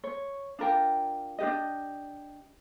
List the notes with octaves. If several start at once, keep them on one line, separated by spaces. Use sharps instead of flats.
C#5
D4 F4 A#4 G5
D4 F#4 G4 D#5